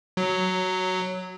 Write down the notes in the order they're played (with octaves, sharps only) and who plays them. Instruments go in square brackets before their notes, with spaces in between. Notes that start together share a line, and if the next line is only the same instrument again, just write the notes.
[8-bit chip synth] F#3